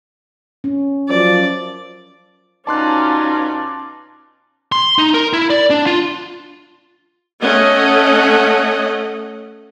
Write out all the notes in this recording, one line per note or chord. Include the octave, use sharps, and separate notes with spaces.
C#4
F#2 F3 D5
B2 C#4 D#4 F4 D5 A5 C6 F#6
C6
D#4
A#4
E4
D5
D4
F4
A3 C#4 D#5 F#5